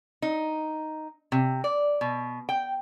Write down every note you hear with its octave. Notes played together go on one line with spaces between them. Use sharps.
D#4
C3
D5
B2
G5